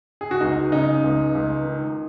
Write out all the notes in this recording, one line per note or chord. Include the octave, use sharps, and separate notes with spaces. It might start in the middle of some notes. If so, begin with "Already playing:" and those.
G#4
F#4
C#2 D#4
C#3 D#4
C#2
C#2
D#3